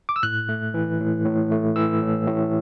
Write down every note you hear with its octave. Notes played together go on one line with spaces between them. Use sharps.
D6
E6
A2 F#6
A3
E3
A2
A2
A3
E3 E6
A2
A2